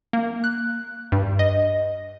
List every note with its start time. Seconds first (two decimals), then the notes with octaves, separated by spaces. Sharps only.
0.13 A#3
0.44 F#6
1.12 G2
1.39 D#5